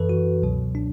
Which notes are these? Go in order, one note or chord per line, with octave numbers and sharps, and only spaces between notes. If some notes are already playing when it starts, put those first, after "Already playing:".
Already playing: F#2 E3 A4 B4
F#4
C#2 B2 F#3
D4